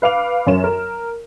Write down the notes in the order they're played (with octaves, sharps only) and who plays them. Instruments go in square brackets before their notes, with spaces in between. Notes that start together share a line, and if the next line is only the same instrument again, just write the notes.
[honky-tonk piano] B4 F5 D6 F7
F#2 C#4 E7
A#4